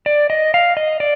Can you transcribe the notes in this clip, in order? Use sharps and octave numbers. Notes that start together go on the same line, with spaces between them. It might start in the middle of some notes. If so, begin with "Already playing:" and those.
D5
D#5
F5
D#5
D5